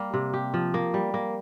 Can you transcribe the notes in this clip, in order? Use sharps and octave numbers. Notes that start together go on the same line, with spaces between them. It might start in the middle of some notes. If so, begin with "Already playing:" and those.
Already playing: G3 A#3
C3
G4
F3
A#3
G3
A#3